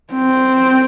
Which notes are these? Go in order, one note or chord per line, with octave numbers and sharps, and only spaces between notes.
C4